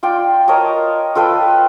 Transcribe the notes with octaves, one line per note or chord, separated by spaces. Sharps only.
F4 D5 G5
A#4 C#5 D#5 A5
F4 A4 B4 G5